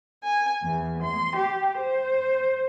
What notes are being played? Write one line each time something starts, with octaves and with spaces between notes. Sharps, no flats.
G#5
E2
C6
G4
C5